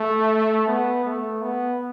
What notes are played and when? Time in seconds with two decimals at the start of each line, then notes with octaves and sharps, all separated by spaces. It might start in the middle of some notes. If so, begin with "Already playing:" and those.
Already playing: A3
0.68 B3
1.05 A3
1.42 B3